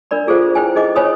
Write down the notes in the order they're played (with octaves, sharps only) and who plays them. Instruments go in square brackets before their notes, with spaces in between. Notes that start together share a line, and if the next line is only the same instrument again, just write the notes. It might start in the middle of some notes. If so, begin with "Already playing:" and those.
[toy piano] D4 A#4 D5 B5
F4 G#4 A4 C5 F5
E4 B4 C5 G5 G#5
D#4 G#4 D#5 D6
C5 C#5 G#5 B5 D#6